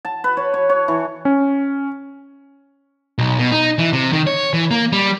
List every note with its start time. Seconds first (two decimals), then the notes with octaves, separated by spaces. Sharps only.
0.05 A5
0.24 B4
0.37 C#5
0.54 C#5
0.69 C#5
0.88 E3
1.25 C#4
3.18 B1
3.39 B2
3.51 D#4
3.78 E3
3.93 C3
4.13 D#3
4.27 C#5
4.53 E3
4.71 A#3
4.92 G3